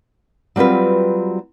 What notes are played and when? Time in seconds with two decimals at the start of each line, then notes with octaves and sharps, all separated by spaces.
0.56 F#3 G3 C4 F4 B4